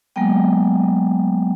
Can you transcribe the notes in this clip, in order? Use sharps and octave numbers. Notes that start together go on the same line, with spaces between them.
F#3 G#3 A#3 B3 G5